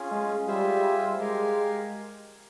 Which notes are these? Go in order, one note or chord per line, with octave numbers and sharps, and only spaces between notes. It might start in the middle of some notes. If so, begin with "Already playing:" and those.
Already playing: C#4 F4 G#4
G#3
G3 F4 G#4 C5 E5
G#3 G4 A#4 F5 G#5